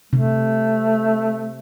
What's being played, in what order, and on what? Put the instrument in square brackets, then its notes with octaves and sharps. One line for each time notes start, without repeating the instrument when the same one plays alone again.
[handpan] C3 [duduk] A3